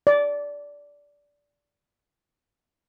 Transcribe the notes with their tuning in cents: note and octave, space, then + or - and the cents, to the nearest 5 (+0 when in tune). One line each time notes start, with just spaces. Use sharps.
D5 -15